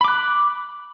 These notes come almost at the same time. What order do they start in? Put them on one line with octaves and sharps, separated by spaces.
B5 D6 F#6